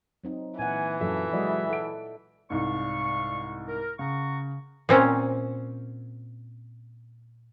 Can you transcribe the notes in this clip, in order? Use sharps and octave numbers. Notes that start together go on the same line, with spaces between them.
F#3 C4 D#4
A#2 E3 E4 F#5 G#5
F#2 F4 A4 E5
F#3 G#3 D5 D#5
A4 F#5 D7
C2 G#2 D5 F5 C#6
A#4
C#3 F#5 A#5 C#6
A#2 C4 C#4